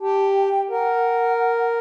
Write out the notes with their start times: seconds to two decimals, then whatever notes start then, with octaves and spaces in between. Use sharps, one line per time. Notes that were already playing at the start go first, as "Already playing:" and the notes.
0.01 G4 A5
0.36 G5
0.70 A#4 F#5